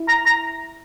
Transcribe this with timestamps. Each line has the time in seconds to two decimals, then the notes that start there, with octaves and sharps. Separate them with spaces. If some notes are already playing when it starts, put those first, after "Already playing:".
Already playing: E4
0.08 A#5
0.26 A#5